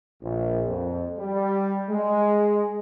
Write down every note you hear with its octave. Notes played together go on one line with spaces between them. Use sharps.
A#1
F2
G3
G#3